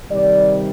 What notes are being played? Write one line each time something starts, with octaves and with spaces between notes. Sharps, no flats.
C3 D#3 G3 D5